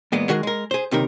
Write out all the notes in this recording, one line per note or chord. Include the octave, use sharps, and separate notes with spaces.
E2 A#2 G#3 B3
D#3 G#3 F#4 G#4 A#4
G#3 A#4
G#4 C5
C#2 C3 D#3 A#4